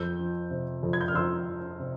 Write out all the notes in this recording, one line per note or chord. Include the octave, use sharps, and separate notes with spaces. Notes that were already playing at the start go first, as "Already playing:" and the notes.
Already playing: F2 E6 G6
F3
C3
F2
G#6
G6
F6
F2 C6 E6
F3
C3